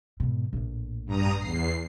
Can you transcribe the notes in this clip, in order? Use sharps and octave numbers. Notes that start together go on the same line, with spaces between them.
G#2 B2
A#1 A2
G2 A#5 D#6
E2 C7